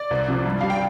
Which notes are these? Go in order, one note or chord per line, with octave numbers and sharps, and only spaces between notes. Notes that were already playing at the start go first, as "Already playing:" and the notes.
Already playing: D5
C2
C3 F3
G2
G3 F5
G5